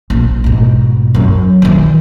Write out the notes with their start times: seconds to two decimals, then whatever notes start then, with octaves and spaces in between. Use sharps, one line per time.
0.10 A#1
0.44 G#2 B2
1.14 F#2
1.62 D#3 E3